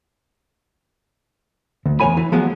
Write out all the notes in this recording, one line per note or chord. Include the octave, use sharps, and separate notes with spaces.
D2
E2 G#3 C#5 G#5 B5
E3
F3 F#3 G#3 B3